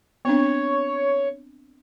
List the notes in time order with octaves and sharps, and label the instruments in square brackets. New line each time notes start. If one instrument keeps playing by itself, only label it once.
[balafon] B3 C4 D4 [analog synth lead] C#5